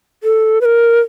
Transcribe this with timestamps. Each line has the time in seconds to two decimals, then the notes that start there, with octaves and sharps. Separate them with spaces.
0.23 A4
0.61 B4
0.65 A#4